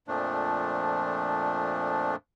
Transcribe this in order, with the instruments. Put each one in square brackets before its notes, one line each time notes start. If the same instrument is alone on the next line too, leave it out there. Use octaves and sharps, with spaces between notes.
[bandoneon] F2 A#2 F3 A3 D4